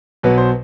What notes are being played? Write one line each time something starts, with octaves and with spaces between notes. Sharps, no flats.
B1 B2 F#3 B3 B4
C5